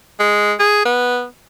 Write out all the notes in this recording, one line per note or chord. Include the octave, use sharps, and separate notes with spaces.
G#3
G#4
B3